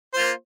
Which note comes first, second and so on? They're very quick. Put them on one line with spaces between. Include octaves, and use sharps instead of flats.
C5 F4 A#3